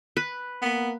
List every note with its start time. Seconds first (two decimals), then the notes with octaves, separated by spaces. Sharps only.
0.17 B4
0.62 A#3 B3